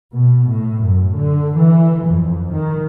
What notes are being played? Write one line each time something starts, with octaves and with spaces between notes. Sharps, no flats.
B2
A2
F#2
D3
E3
F2
D#3